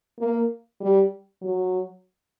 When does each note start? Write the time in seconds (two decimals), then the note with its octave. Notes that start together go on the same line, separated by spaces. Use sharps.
0.20 A#3
0.81 G3
1.42 F#3